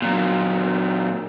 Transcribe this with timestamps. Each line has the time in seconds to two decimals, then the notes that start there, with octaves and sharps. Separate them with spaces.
0.02 A#2 F#3